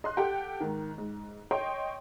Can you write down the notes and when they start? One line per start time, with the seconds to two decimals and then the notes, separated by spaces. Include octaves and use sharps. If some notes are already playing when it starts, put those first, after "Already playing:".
0.04 D#5 C6 F#6
0.17 G4 A4 F#5 G5
0.60 G#2 D#3
0.98 G#2
1.51 C#5 D#5 G5 C6